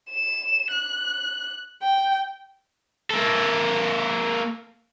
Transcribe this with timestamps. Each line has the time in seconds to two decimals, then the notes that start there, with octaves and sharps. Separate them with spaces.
0.10 E7
0.71 F#6
1.82 G5
3.10 A#3 A4